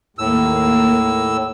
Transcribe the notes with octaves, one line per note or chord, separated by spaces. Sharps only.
D#2 A2 A#3 E6